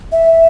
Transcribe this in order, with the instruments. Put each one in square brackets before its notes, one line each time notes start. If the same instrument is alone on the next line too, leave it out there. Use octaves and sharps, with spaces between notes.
[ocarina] E5